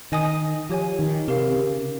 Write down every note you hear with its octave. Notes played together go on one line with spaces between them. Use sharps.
D#3 D#5 G#5 D#6
F3 G4 C#5 G#5
D#3
C3 G4 A#4 F5
C#3